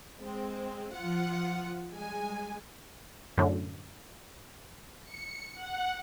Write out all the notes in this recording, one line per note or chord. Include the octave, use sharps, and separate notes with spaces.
G#3 C4
F3 F4 F#5
G3 G#3 G#5
F#2 A2 D3 F#3
C#7
F#5